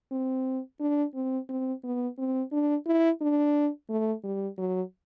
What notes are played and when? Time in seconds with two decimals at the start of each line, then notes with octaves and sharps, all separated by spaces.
0.12 C4
0.80 D4
1.15 C4
1.49 C4
1.84 B3
2.18 C4
2.52 D4
2.86 E4
3.21 D4
3.89 A3
4.24 G3
4.58 F#3